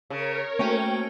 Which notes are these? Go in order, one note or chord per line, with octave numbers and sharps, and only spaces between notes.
C#3 A#4 C#5
A3 A#3 C#4 F#4 C5 G5